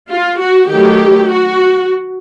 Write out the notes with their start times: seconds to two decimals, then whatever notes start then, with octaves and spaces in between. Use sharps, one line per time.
0.11 F4
0.41 F#4
0.72 D#3 F#3 A3 G4
1.32 F#4